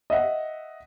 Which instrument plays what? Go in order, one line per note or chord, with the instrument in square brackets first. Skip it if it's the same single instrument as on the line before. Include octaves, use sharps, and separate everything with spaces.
[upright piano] D#5 E5 F#5